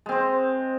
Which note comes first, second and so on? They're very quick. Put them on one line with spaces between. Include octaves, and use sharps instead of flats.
G#3 C4 C5